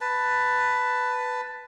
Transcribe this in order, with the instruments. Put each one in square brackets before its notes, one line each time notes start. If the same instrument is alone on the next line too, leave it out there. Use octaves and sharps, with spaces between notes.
[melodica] B4 A5